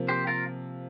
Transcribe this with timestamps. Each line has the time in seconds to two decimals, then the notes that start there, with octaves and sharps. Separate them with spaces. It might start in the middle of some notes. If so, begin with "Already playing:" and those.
Already playing: C3 F3 A#3
0.08 G4 C5
0.27 F4 A#4